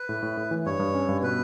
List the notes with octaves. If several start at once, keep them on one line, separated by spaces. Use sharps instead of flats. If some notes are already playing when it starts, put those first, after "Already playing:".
Already playing: B4
A2
A2
A2
E3
G2 C#5
G2
C#4
G2
B2 B4